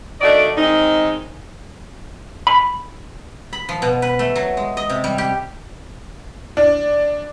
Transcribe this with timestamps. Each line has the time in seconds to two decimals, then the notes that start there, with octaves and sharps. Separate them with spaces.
0.21 D#3 A3 D4 F#4 D5 D#5
0.57 D#3 G#3 C4 D#4
2.47 B5
3.53 B5
3.69 F3
3.82 B2
4.02 B4
4.19 A3
4.36 F#3
4.57 G#3
4.77 D#5
4.90 C3
5.04 G3
5.18 G4
6.57 D4